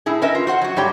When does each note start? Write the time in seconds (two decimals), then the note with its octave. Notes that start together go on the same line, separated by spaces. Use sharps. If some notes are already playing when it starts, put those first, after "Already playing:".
0.06 A2 E4 G#4
0.22 C#4 A#4 B4 D#5 E5
0.35 F4
0.47 F#4 C5 F#5
0.61 F#3 F#4
0.76 G#2 G3 A3 G4 C#5 G5